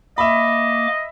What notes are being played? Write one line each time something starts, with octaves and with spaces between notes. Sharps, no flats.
A#3 D#5 E5 B5 D6